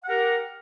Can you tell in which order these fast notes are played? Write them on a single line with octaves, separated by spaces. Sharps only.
F#5 G4 A#4